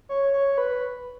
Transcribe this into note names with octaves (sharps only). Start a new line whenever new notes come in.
C#5
C#5
B4